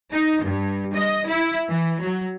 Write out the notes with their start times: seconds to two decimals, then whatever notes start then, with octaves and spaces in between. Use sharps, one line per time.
0.12 D#4
0.44 G2
0.94 D#5
1.28 E4
1.69 E3
2.02 F#3